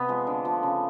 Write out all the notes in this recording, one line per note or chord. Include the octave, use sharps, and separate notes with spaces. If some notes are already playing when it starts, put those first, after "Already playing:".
Already playing: C3 B3
F3 G#3
D3
F3 A3
C#3